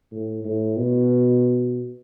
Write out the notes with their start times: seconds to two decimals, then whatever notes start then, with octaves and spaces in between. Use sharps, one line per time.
0.12 A2
0.45 A2
0.77 B2